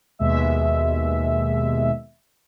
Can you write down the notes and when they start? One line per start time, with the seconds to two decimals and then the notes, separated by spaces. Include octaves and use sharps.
0.19 D#2 B2 G#3 E5